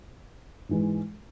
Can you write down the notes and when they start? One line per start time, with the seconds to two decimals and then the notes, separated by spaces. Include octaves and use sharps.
0.69 G#2 E3 G#3